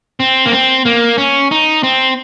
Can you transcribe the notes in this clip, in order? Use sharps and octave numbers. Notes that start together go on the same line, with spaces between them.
C4
A#3
C4
A#3
C#4
D#4
C4